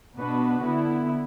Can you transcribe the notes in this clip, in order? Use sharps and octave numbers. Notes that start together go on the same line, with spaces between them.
B2 B3 D4 F#4 B4
D3 B3 E4